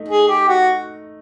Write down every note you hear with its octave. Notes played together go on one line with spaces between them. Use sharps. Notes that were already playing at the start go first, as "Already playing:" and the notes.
Already playing: A3 D#4
G#4
G4
F#4